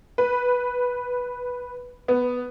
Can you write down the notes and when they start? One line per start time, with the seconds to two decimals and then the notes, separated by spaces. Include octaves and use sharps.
0.18 B4
2.08 B3